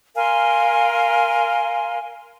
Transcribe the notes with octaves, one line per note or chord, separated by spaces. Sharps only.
A#4 F5 G#5 C6